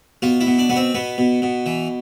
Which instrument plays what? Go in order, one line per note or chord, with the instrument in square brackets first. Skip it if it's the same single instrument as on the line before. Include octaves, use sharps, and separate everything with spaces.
[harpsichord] B2 F4
E4
B2
D4
B2 B3
C4
B2 B3
B2
B2
E3